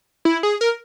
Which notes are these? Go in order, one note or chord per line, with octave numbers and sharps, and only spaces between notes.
E4
G#4
A#4